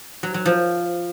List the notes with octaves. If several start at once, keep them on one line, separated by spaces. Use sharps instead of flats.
F#3
F#3
F3